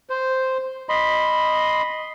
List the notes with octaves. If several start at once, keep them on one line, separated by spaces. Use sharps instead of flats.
C5
D#5 B5 C6